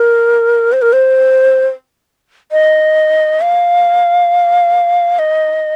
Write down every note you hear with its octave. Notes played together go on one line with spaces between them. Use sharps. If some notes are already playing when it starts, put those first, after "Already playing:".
Already playing: A#4
C5
A#4
C5
D#5
F5
D#5